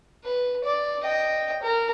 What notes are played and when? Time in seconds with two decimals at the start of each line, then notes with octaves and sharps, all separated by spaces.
0.24 B4
0.64 D5
1.03 D#5 G5
1.62 A#4